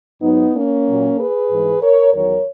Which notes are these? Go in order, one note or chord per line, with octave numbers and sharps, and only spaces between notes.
G#2 F#3 B3 D#4
A#3 C#4
A#2 F#3
G#4 B4
G#2 E3 G#3
A#4 C#5
E2 D#3 F#3 A#4 C#5